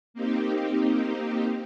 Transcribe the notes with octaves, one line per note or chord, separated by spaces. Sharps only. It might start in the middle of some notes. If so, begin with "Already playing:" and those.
A#3 C4 D#4 G4